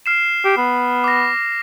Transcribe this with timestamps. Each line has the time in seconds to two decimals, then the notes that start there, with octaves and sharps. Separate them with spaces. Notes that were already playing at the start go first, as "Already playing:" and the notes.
0.06 F6 C7 E7
0.45 G4
0.57 B3
1.04 D6 A#6